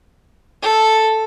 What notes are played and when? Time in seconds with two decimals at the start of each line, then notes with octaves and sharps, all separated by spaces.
0.62 A4